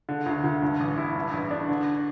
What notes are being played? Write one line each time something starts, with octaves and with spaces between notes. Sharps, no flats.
D3
D2
D2
G2
A1
E4
G2
A1
D4
D3